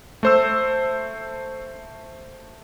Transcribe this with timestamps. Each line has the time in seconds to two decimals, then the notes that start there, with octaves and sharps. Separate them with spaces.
0.23 A3 C5 E6